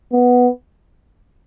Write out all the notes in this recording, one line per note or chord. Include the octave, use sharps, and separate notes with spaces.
B3